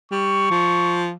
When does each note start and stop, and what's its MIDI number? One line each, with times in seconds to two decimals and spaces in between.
0.11 0.48 55
0.11 1.01 85
0.51 1.13 53